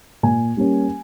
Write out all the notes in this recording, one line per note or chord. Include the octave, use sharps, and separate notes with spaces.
A#2 G#5
G3 A#3 C#4